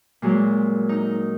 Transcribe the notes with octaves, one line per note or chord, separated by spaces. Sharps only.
A#2 F#3 G#3
D#4